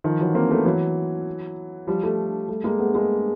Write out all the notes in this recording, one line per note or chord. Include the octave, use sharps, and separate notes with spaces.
D#3 F3
E3 F#3
A#3 C4
A3 B3
E3 F#3
F3 G3
G3 A3
G3 A3
G#3 A#3
A3 B3
G#3 A#3